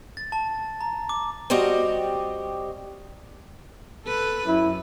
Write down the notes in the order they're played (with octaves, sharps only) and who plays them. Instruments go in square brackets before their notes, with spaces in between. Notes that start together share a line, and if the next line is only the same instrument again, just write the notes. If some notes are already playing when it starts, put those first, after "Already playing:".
[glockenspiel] A6
A5
A#5
D6
[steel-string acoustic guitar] G3 C4 F#4 G4 D#5
[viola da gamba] A4 B4
[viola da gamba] F#2 [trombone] E4